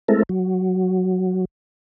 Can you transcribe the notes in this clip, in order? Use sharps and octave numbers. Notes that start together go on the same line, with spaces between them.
G#3 A3 C4 E4 A4 A#4
F#3